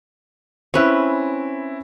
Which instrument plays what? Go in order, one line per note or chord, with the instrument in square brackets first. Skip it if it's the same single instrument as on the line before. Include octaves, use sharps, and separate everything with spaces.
[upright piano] C4 E4 [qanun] C#4 B4